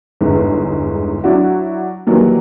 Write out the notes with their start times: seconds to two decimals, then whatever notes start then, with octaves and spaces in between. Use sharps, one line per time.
0.21 G1 E2 G#2
1.24 F#3 D4 E4 F#4
2.07 D#3 E3 F#3 G3 A#3